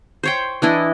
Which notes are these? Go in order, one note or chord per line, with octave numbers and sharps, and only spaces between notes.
C5 C#5 G5
E3 D4 E4 D#5